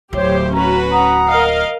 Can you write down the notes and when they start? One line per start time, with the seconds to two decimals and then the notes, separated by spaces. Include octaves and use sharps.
0.13 D1 E4 G4 C5 C#5
0.53 C#4 F#4 B4 A#5
0.91 F#5 A#5 D#6
1.28 A#4 D#5 F5